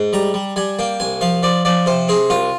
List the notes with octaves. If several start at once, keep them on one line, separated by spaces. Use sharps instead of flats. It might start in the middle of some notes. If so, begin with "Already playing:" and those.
Already playing: G#2
G3 A#5
G3
G3 G#5
A#3 G5
C2 G#5
F3 F5
F3 D5
F3 D5
C3 C5
C4 G#4
C2 F4